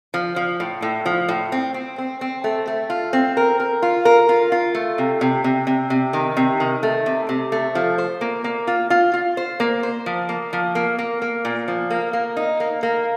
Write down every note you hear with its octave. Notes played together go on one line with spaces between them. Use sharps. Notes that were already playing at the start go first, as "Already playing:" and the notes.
F3
F3
A2
A2
F3
A2
C4
C4
C4
C4
A3
A3
F4
C4
A#4
A#4
F4
A#4
F4
F4
A3
C3
C3
C3
C3
C3
D#3
C3
D#3
A3
C3
C3
A3
F3
C5
A#3
A#3
F4
F4
F4
C5
A#3
C5
F3
A#3
F3
A#3
A#3
A#3
A#2
F3
A#3
A#3
D#4
A#3
A#3